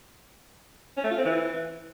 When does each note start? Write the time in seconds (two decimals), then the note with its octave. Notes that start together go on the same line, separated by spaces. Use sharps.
0.97 C#4
1.04 A3
1.11 F4
1.18 C4
1.25 E3